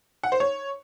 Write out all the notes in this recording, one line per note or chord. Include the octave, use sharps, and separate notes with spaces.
F#5
C5
C#5